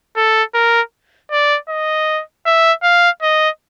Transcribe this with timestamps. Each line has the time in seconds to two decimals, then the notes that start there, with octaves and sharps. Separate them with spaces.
0.17 A4
0.55 A#4
1.31 D5
1.69 D#5
2.46 E5
2.83 F5
3.22 D#5